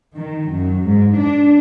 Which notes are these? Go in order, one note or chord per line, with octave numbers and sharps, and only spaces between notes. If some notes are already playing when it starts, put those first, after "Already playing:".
D#3
F#2
G#2
D4